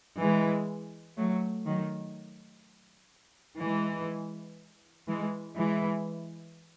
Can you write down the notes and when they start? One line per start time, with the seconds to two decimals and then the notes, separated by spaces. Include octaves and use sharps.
0.20 E3 G#3
1.17 F#3 A3
1.66 D#3 F#3
3.61 E3 G#3
5.08 E3 G#3
5.56 E3 G#3